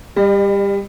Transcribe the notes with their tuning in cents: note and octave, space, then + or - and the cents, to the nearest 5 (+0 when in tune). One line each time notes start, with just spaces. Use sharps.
G3 +25 D#5 -45